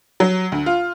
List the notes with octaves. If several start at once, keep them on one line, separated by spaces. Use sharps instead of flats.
F#3
D2
F4